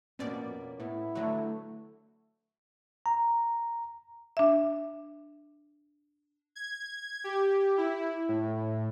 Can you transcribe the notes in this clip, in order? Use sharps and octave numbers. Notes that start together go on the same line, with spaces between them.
F2 B2 A#3 B3 C#4 D5
A2 B3 E4
D3 F#3 A3
A#5
D4 E5
G#6
G4
E4
A2